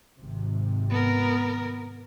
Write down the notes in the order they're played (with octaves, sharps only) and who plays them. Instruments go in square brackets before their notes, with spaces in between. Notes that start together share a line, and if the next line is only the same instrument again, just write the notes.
[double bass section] G#1 C3
[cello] B3 A#4